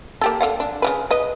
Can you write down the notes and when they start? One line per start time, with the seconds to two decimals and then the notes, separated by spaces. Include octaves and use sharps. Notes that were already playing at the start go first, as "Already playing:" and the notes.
0.21 A#3 G4 A4
0.41 D3 F5 F#5
0.60 D4
0.82 C#3 F#3 B4
1.11 B4 D#5